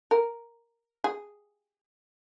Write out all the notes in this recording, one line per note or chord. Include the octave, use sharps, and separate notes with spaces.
A#4
G#4